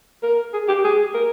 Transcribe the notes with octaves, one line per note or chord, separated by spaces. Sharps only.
A#4
G#4
G4
G#4
A#4